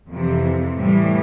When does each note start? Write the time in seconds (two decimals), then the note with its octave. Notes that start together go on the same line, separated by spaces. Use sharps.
0.08 F2 C3 E3
0.76 A2 E3 G3